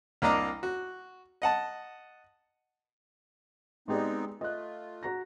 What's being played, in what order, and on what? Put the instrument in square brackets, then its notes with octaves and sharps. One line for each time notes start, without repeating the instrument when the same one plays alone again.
[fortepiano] C2 A#3 D4 D#5 A#5 D6
F#4
D#5 F#5 A5
[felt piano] G#3 G4 D5 [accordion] B3 C4 D#4
[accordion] A3 F4 [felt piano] D#5 F#6
[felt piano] F#4 A#5 A#6